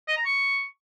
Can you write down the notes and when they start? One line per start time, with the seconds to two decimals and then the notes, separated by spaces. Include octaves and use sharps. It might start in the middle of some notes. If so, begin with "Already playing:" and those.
0.08 D#5
0.17 A#5
0.25 C#6